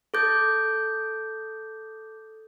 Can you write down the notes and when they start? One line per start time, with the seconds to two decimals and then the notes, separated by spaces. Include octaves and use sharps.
0.14 A4 D6 G6 A6